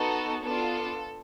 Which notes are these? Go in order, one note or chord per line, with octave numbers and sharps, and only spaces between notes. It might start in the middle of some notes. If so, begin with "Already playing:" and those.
Already playing: B3 D#4 F#4 A4
B3 D4 F4 A4